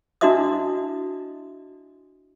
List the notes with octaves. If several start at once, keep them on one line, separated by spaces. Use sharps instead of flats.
D4 E4 F#4 D#5 E5 D#6